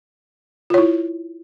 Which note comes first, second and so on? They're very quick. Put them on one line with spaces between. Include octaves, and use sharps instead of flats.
F4 C#5 E4